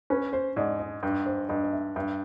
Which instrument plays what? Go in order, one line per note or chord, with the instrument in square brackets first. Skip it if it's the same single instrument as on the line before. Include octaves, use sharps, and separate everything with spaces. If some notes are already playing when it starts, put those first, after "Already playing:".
[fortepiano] C#4 [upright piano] B4
[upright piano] C5
[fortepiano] G#2 [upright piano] D5
[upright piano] D#5
[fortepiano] G2
[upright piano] C5
[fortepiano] G2 [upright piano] D#5
[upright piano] D#5
E5
[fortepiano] G2 [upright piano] E5